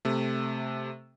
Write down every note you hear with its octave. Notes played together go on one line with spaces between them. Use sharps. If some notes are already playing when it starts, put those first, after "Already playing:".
C3 A3